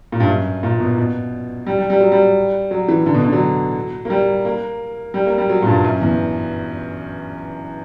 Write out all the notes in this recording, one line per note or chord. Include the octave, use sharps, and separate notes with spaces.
A#2
G2
F#2
A#2
B2
B2
G3
G3
G3
F#3
G3
F#3
E3
D3
B2
D3
F#3
A#3
G3
A#3
G3
A#3
G3
F#3
A#2
G2
F#2
E2